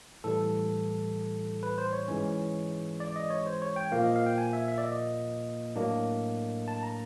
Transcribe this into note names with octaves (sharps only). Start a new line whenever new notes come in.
A2 E3 G3 A4
B4
C5
C#5
G#2 E3 G#3 C#4
D5
D#5
C#5
C5
C#5
G5
A#2 F3 A#3 F5
D#5
F5
G5
G#5
E5
E5
D5
D#5
A2 F#3 A#3 D4
A5
A#5